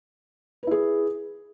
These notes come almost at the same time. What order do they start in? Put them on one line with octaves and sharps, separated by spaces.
B4 E4 G#4